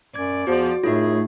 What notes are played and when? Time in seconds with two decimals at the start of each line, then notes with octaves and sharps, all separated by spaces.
0.15 F#2 D5 G#6
0.47 E2 F3 F#4
0.83 F#2 A2 A3 D#4 F4 G#4